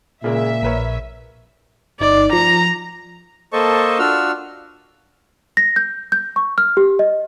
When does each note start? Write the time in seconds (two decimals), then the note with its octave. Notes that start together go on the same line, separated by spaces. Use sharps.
0.24 A#2 C#3 G#3 A#3 E5
0.63 A#1 A#4 B4 C#5
2.00 G1 D#4 D5
2.33 F3 A#5
3.52 A#3 A4 C5 D#5 A5 C#6
3.99 D4 F4 F#4 E6 F6
5.57 A#6
5.76 G6
6.12 G6
6.36 C#6
6.58 F6
6.77 G4
6.99 D#5